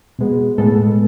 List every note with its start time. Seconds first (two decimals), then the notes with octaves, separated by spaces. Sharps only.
0.19 B2 G#3 B3
0.58 A2 G#3 B3 A4